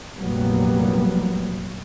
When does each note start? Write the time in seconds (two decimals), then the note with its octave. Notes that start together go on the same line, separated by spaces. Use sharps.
0.16 F1 A#1 F#3 G3 A#3 B3